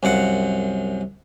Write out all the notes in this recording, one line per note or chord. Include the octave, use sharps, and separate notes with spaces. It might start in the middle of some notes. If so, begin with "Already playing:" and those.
C2 F#2 F5 F#5